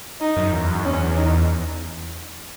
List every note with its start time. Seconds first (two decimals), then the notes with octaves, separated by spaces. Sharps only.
0.21 D#4
0.37 F#2
0.52 E2
0.69 F#2
0.85 E2 C#4
1.17 D#4